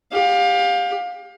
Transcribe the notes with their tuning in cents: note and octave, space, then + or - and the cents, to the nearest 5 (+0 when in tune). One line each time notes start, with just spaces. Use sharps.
G4 +20 F5 +30